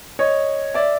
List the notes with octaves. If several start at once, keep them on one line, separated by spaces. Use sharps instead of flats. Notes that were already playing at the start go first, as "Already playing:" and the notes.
C#5 D#5
D5 E5